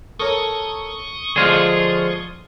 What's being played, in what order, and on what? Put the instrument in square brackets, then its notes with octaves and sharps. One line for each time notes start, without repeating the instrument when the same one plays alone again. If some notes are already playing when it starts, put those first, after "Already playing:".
[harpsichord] A4 A#4 C#5 [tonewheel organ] C#6 D#6
[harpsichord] D3 F3 G#3 [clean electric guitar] F4 G#4